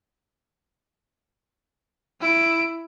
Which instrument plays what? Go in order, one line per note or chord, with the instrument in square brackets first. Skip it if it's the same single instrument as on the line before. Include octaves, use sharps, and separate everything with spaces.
[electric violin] E4 D7